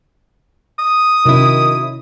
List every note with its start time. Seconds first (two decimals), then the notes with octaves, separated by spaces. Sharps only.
0.79 D#6
1.25 C3 D#3 F#3 C#4 E4